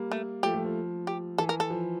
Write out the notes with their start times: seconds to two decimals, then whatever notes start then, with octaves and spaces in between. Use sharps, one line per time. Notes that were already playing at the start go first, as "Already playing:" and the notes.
Already playing: G3 A#3
0.11 A3
0.43 F3 A3 G4
0.53 F3 A3
0.64 F3
1.07 G4
1.38 E3 A4
1.49 A#4
1.60 A4
1.70 F3